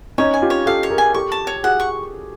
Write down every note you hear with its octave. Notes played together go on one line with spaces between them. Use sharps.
C#4 D#4 C#5
G#5
F4 G4
C#5
G4 A4 F5
C#5
G#4 A#4
G#5
G4 A4 C#6
A5
C#5
F#4 G#4 F#5
C#6